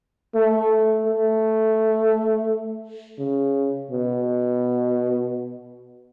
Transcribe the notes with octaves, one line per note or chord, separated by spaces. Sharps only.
A3
A3
C#3
B2